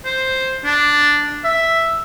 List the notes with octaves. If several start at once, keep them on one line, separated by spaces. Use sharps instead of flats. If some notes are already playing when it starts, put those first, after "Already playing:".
C5
D4
E5